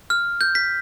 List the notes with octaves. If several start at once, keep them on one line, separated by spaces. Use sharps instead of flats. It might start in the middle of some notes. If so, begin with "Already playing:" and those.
F6
G6
B6